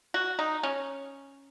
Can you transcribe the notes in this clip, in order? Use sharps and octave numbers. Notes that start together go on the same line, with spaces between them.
F#4
D#4
C#4